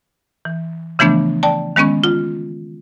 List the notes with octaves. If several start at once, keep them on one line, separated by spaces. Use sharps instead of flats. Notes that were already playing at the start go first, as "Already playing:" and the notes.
E3
C#3 E3 F3 A3 B3 D4
D5 G5 A5
D#3 G#3 B3 C#4 C#6
F4